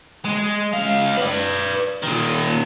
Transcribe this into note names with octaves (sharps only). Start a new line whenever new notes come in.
G#3
C#2 F5
B4 D5
A#2 D#3